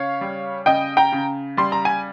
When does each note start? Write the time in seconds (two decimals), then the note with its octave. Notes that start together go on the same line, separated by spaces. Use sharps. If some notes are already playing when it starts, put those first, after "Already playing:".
Already playing: C#3 C#5 F5
0.21 G3
0.66 C#3 D#5 G5
0.97 G5 A#5
1.12 C#3
1.57 G3 C6
1.72 A#5
1.85 G#5